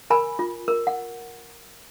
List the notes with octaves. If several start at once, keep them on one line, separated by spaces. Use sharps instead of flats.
A#4 G#5 B5
F4
A#4
F#5